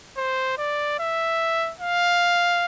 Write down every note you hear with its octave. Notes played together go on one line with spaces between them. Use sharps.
C5
D5
E5
F5